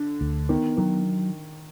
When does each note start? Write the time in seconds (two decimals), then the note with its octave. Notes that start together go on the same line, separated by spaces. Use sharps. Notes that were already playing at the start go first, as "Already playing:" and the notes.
Already playing: D3
0.21 D2
0.49 D#3 B3
0.77 D#3 F#3